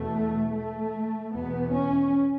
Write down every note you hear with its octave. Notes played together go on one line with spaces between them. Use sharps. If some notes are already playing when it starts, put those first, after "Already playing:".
Already playing: E2 B2 A3
A3
E2 B2 B3
C#4